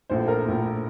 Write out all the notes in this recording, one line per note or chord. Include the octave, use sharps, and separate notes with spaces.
A#1 A2 A3 C5
A#4
A#1 A2 A3